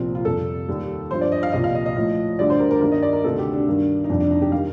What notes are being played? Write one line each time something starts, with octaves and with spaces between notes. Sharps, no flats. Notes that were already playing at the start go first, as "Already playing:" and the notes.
Already playing: C2 A#2 F3 C4
F4
F2 C3 G3 A4
D#2 D#3 G3
G2 F3 C5
D5
D#5
F5
C2 A#2 F3 D#5
F5
D#5
D#5
A2 F3
D2 D3 G3 D5
C5
A#4
A#4
G2 D#3 G3 A#4
D#5
D5
A#4
D2 C3 D#3 A4
G4
D4
G2 D#3 G3
D#4
F2 C3 G3 D4
D4
D#4
G4
D#3 G3 F5